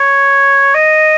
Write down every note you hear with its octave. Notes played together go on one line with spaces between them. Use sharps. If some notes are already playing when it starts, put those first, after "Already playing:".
Already playing: C#5
D#5